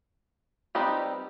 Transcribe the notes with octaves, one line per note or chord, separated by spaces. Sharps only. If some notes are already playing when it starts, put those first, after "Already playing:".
G3 C4 D#4 G4 B4